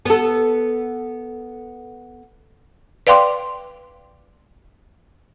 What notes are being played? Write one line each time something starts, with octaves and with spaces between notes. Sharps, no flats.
B3 A4
B4 D5 F5 G5 C6 D6